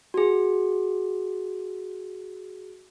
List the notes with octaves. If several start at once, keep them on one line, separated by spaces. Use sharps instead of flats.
F#4 G#4